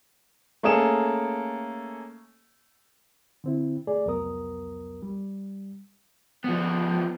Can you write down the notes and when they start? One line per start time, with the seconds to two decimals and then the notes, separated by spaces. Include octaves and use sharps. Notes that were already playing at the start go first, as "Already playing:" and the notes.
0.63 A3 A#3 C#4 G#4 A4 E7
3.44 D3 C4 E4
3.87 A3 G#4 D5
4.06 C2 F2 F#3 B3 A#4 D#6
5.03 G3
6.44 F3 B3